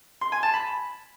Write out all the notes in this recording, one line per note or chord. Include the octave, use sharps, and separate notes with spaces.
C6
G#5
A5
B5